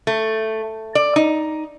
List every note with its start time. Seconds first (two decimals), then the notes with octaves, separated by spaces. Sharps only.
0.07 A3
0.95 D5
1.16 D#4